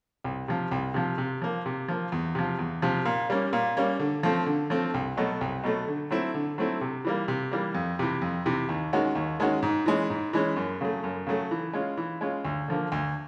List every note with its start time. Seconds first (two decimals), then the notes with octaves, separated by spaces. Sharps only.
0.24 C2
0.48 C3 F3
0.71 C2
0.94 C3 F3
1.18 C3
1.42 F3 A#3
1.66 C3
1.88 F3 A#3
2.12 E2
2.35 C3 F3
2.59 E2
2.82 C3 F3
3.05 A#2
3.30 G3 A#3 C#4
3.53 A#2
3.77 G3 A#3 C#4
4.00 D3
4.23 F3 A3 C4
4.46 D3
4.70 F3 A3 C4
4.94 C2
5.17 B2 F#3 A3
5.41 C2
5.63 B2 F#3 A3
5.88 D3
6.11 F#3 A3 C4 E4
6.34 D3
6.58 F#3 A3 C4 E4
6.81 C3
7.05 E3 G3 A#3
7.28 C3
7.51 E3 G3 A#3
7.75 F2
7.99 C3 E3
8.22 F2
8.46 C3 E3
8.69 D#2
8.93 D#3 G#3 C#4 F#4
9.15 D#2
9.40 D#3 G#3 C#4 F#4
9.62 G#2
9.86 E3 G#3 C#4
10.10 G#2
10.33 E3 G#3 C#4
10.56 F#2
10.81 C#3 F#3 A3
11.04 F#2
11.27 C#3 F#3 A3
11.51 E3
11.73 G#3 C#4 F4
11.97 E3
12.21 G#3 C#4 F4
12.45 D2
12.68 D3 F3 A#3
12.92 D2